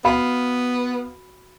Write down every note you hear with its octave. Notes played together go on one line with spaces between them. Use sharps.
B3 F#4 F5 B5